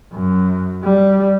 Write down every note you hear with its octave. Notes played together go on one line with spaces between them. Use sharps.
F#2
G3